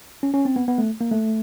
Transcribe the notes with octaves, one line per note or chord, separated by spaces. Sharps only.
C#4
C#4
C4
B3
B3
A3
A#3
A3